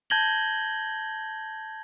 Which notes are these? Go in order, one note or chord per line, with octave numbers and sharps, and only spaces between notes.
A5 G6 G#6 A#6 F#7 G7